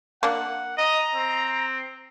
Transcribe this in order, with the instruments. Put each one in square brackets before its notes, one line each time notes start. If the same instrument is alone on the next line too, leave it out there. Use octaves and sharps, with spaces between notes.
[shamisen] A#3 D4 [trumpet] F#5
[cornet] D#5 [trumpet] A#5
[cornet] C4